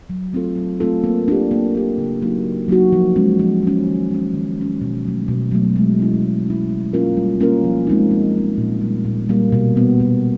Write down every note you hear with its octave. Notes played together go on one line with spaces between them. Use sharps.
F#3
A3 C4 F4 A4
F#3
A3 C4 F4 A4
A#3
D4 G4
A#3
D4 G4
C#3
F#3 A#3 D#4 F#4
C#3
F#3 A#3 D#4 F#4
F3
G#3 C#4
F3
G#3 C#4
D#3
G#3 C#4
D#3
G#3 C#4
B2
F#3 A3
B2
F#3 A3
G#3
C#4 E4
G#3
C#4 E4
G3
A#3 C#4 F4 A#4
G3
A#3 C#4 F4 A#4
F3
G#3 C4 D#4
F3
G#3 C4 D#4
A#2
G3 A#3
A#2
G3 A#3
B2
G3 B3
B2